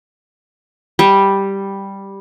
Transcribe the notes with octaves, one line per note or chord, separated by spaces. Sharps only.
G3